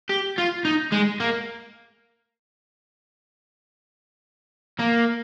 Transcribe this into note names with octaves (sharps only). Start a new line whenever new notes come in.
G4
F4
D#4
G#3
A#3
A#3